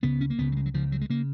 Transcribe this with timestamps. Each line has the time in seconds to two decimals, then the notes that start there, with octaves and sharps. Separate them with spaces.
0.03 C#2 C#3 B3
0.21 C#4
0.30 A#3
0.38 C#2 C#3 B3
0.52 F#3
0.56 G#3
0.66 F#3
0.74 C#2 C#3 F3
0.92 F#3
1.01 G#3
1.10 C#3 A#3